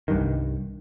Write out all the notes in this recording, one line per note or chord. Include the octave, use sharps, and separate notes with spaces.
C2 G2 D#3